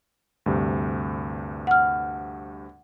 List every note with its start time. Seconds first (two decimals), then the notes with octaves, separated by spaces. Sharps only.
0.46 D2 G2 C3
1.67 F#5 F6